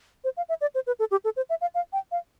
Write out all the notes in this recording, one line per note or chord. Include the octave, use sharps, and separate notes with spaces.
C5
F5
E5
D5
C5
B4
A4
G4
A4
C5
E5
F5
F5
G5
F5